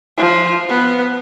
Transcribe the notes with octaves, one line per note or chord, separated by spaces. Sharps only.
F3
B3